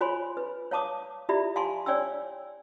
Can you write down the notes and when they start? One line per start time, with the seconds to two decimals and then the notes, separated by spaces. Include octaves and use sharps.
0.01 F4 C5 C#5 G#5 B5 C6
0.37 B4
0.71 C#5 F5 A5 D6 D#6
1.29 E4 F4 G4 D5 E5 B5
1.56 F5 G#5 A5 C6 C#6
1.86 C#5 D5 G5 G#5 E6